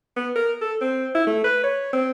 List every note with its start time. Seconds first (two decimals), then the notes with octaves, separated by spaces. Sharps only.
0.17 B3
0.36 A#4
0.61 A4
0.82 C4
1.15 E4
1.27 A3
1.44 B4
1.64 C#5
1.93 C4